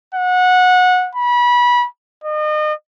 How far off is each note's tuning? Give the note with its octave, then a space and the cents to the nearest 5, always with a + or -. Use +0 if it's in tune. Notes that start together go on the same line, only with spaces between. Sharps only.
F#5 -20
B5 -25
D#5 -35